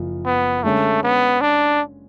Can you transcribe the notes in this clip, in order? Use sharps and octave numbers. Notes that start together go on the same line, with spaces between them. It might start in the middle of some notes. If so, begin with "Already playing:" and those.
Already playing: F#1 F3
B3
D3 G#3 A3 C#4
B3
D4